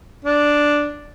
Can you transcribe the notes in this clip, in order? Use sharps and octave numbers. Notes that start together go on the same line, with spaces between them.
D4